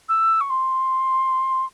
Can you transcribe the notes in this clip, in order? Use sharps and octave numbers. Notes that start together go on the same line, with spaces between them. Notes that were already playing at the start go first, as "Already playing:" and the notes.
E6
C#6
C6